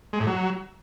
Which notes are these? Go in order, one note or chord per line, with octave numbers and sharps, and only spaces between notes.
G#3
A2
F#3